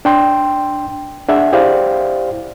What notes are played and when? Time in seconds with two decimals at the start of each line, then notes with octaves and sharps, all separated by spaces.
0.05 D4 G5 C6
1.28 D4 G#4 E5 F#5
1.53 E4 G4 C5 D5 F5